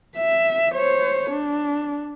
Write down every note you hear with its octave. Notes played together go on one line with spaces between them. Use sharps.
E5
C5 C#5
D4